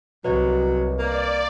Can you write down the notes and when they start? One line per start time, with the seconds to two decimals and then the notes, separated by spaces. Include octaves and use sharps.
0.24 C2 F#3 B4 C#5 D#5
0.99 A#3 D5